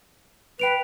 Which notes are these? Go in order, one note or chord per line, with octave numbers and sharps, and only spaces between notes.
B4 G5 D7 F7